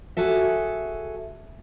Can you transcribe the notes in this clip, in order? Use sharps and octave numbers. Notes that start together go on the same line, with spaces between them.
F#4 G#4 A4 E5